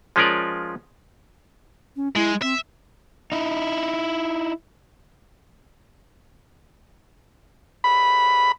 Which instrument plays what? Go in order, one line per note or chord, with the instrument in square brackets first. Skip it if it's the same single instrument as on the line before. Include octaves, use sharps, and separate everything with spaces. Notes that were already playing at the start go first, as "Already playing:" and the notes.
[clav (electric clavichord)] F3 G#3 C#4 F4 A#4 D5
[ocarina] C#4
[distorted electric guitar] G#3 [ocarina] E4
[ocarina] C4 [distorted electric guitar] E5
[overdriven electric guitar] D#4 E4
[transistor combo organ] B5